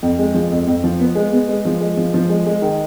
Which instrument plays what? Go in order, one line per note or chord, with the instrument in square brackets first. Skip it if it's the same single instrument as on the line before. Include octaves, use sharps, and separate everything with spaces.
[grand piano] F2
G#3
F3
F2
F2
F3
B3
G#3
B3
G#3
F3
G#3
F3
F3
G#3
G#3
D#3